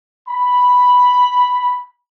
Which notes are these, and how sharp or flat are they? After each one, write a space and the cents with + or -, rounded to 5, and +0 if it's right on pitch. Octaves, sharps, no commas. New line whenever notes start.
B5 +0